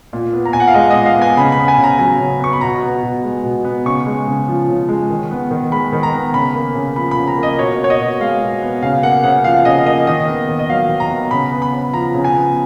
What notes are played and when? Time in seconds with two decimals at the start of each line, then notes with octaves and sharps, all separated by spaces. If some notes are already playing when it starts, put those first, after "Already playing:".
0.13 A#2
0.33 B3
0.45 A#5
0.53 A#2 G#5
0.60 F#5
0.67 F5
0.74 G#3 D#5
0.91 A#2 D#5
1.06 F5
1.17 B3 G#5
1.37 C#3 B5
1.52 B5
1.58 B3
1.68 G#5
1.78 C#3
1.83 A#5
1.99 F#3 G#5
2.20 C#3
2.40 B3 C#6
2.53 B5
2.61 B2 A#5
2.82 B3
3.03 B2
3.24 G#3
3.44 B2
3.65 B3
3.86 C#3 C#6
4.06 G#3
4.27 C#3
4.48 F3
4.69 C#3
4.89 G#3
5.10 D#3
5.31 B3
5.51 D#3
5.72 G#3 B5
5.93 D#3
6.03 A#5
6.13 B3
6.34 C#3 B5
6.55 A#3
6.75 C#3
6.96 F3 B5
7.11 B5
7.17 C#3
7.28 A#5
7.38 A#3
7.43 D#5
7.58 B2 C#5
7.79 B3
7.84 C#5
7.90 D#5
8.00 B2
8.20 G#3 F5
8.41 B2
8.62 B3
8.82 C#3 F5
9.03 A#3 F#5
9.24 C#3 F#5
9.44 F3 F5
9.65 C#3 D#5
9.86 A#3 D#5
10.07 D#3 D#5
10.28 B3
10.49 D#3
10.59 D#5
10.70 F#3 F5
10.89 D#3
11.00 A#5
11.10 B3
11.31 C#3 B5
11.52 B3
11.62 B5
11.73 C#3
11.93 F3 A#5
12.15 C#3
12.24 G#5
12.35 B3